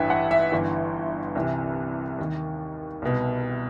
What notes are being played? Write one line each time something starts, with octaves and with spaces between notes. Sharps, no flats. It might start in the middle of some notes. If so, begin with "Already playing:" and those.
Already playing: A1 G2 E3 B4 E5
F#5
E5
G1 G2 E3
C2 C3 E3
D#2 D#3
C2 B2